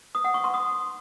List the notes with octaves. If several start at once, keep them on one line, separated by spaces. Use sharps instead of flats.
D#6
F#5
C#6
C6
D#6